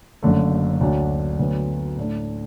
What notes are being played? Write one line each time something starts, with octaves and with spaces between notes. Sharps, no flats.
F#1 F#2 D3 A3
D2 D3 F#3 D4 F#4
D2 D3 F#3 B3
A2 A3 D4